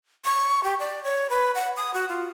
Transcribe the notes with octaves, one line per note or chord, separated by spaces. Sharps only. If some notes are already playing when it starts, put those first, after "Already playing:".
C#6
G4
D5
C#5
B4
F#5
D#6
F#4
F4